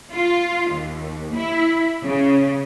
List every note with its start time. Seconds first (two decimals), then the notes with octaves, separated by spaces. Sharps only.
0.11 F4
0.71 D#2
1.34 E4
2.03 C#3